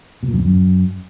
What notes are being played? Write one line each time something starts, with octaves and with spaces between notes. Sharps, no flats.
B2
A#2
F#2
E2
F#2